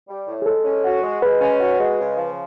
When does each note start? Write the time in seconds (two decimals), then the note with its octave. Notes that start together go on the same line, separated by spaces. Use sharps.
0.08 G3
0.28 A2
0.42 G#4
0.46 G#3 A4
0.65 C#4
0.84 F#4
1.03 G#3
1.22 G#3 B4
1.41 C#4
1.60 F#4
1.80 G#3
1.99 C#3
2.17 F3